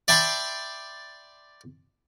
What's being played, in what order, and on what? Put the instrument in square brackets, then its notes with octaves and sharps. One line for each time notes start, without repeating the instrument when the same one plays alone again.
[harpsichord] D5 E5 G5 A5 B5 C6